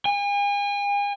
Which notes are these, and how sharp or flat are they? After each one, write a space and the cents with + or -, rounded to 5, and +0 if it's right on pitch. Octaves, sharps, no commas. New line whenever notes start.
G#5 -40